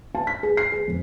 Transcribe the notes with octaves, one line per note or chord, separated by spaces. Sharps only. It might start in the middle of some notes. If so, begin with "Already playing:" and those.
A5
B6
G#4
C7
G#4
F2